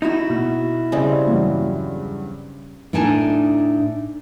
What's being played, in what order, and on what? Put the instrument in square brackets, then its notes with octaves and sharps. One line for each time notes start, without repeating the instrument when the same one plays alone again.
[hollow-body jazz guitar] D#4 E4 F#4
[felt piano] B2
[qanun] C#3 G3 C4 [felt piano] D#5
[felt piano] E2 G2 F#3
[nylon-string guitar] A2 D4 D#4 G#5 A5